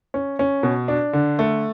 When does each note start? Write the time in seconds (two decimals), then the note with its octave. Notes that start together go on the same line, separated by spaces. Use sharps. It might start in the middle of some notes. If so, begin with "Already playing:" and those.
0.14 C#4
0.39 C#4
0.63 B2
0.88 D4
1.13 D3
1.39 A3